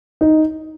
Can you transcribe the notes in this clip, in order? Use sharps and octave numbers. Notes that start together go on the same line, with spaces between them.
D#4